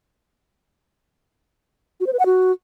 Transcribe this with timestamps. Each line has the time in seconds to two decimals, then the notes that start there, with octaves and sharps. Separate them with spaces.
2.00 F#4
2.07 C5
2.13 B4
2.19 F#5
2.26 F#4